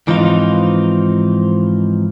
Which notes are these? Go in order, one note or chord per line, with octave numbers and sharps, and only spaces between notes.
G#2 E3 F3 C4 D#4 F4